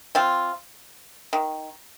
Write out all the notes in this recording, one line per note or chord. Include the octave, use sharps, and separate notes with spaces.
C4 F4
D#3